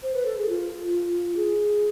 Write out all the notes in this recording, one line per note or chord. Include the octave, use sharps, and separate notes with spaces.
C5
B4
A4
G#4
F4
G#4